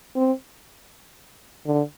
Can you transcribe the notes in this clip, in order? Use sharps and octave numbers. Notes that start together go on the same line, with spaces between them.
C4
D3